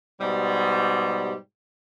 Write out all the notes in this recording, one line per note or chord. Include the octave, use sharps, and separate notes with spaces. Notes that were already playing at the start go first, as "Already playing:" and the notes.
G#2 B2 G3